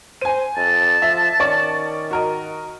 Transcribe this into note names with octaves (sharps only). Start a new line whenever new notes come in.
C5 G#5 D#7
F2 A5
F3 E5
D#3 C#4 D5 C#6
F#4 A#4 D#5